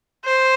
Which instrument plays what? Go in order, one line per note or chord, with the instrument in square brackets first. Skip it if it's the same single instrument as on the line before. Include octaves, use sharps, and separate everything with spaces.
[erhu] C5